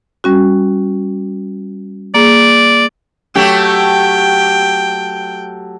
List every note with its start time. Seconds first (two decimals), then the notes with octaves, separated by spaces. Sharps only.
0.24 G3 C#4 F#4
2.15 A#3 G#4 D5
3.35 F#3 A3 G4 G5